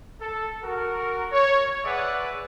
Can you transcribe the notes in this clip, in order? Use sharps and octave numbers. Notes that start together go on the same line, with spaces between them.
A4
F#4 A#4
C#5
G#4 B4 D5 E5 F#5